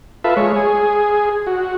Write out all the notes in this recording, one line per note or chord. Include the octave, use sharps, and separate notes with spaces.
F4 A4 B4 E5
G#3 C#5
G#4
F#4